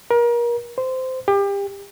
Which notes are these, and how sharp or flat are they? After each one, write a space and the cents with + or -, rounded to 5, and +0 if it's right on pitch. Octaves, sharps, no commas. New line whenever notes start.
A#4 +30
C5 -15
G4 +30